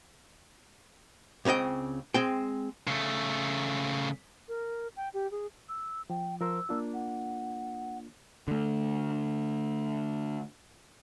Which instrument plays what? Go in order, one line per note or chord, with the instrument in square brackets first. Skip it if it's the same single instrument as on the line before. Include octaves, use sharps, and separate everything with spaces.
[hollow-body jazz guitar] C#2 C#3 C4 D#5 G5
G#3 C4 G5
[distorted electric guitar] C#3 A3
[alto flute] A#4
G5
G4
G#4
[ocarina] E6
[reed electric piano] F3 [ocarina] G5
[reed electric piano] F3 A#4 C5 [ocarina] E6
[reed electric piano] A#3 D4 F4
[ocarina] F#5
[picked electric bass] D3 A3